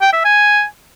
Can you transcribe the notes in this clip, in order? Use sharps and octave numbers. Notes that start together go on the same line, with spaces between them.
G5
E5
G#5